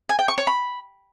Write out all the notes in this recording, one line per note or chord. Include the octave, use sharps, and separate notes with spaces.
G#5
G5
C#6
C#5
B5